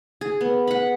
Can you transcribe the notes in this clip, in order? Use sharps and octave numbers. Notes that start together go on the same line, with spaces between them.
G#4
B3
F#5 B5